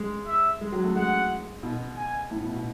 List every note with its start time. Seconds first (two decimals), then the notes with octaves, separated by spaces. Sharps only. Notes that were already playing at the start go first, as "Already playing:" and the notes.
Already playing: G#3
0.27 E5
0.61 G#3
0.72 F#3
0.84 A3
0.95 G#3 F#5
1.63 B2
1.97 G#5
2.31 A2
2.42 B2
2.54 B2